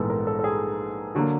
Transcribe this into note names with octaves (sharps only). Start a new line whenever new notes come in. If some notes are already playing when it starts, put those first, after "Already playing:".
Already playing: A#1 G#2 E3 G#3 B3 A4
A#4
A4
A4
G#4
D3 F#3 A#3 F#4